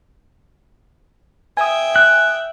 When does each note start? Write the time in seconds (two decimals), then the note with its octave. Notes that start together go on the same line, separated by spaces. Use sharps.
1.57 E5 G5 G#5 D#6
1.96 F#6